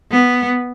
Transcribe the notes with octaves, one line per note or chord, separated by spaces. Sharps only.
B3